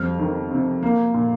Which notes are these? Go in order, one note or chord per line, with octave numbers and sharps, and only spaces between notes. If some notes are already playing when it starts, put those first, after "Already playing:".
Already playing: F2 G3 F6
D#3
C3
A#3
A#2